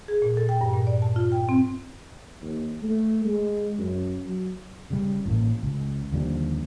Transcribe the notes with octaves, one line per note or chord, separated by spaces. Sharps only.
G#4
A#2
A4
G5
G2
A#2
D5
A5
F4
G5
C4
D#2
A3
G#3
F#2
F#3
C#3 G3
A1 A2 A#3
C#2
D#2 D3 F3 G3